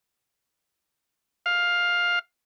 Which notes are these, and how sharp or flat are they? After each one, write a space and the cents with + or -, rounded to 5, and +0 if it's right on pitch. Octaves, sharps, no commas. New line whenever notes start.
F5 +10